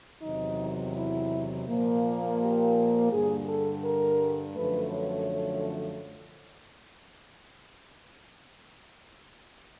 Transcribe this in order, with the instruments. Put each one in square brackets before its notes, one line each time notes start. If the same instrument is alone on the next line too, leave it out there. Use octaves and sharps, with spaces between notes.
[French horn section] E2 C3 D#3 F#3 D#4
E4
A#2 F3 A#3
G4
G2 D3 G3 G#4
A4
A#4
F#2 D3 F3 A3 B4
C#5